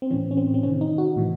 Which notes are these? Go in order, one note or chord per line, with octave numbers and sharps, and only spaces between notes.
C4
A2 E3 C#4
C#4
C4
C4
C3 D#3 C#4
D#4
F#4
A2 E3